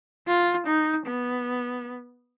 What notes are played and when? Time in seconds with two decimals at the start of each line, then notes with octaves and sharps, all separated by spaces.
0.27 F4
0.66 D#4
1.06 B3